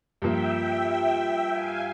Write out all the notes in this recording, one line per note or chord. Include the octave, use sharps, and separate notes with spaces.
G2 F3 A#3 E5 G5
E5 G5
E5 G5
E5 G5
F5 G#5